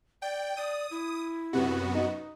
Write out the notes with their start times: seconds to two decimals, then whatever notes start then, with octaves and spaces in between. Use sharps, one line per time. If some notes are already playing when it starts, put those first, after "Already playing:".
0.22 D5 G5
0.57 D5 D#6
0.91 E4
1.53 F#2 C3 B3 F#4
1.95 D#4